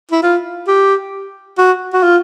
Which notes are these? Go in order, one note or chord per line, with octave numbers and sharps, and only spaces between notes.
E4
F4
G4
F#4
F#4
F4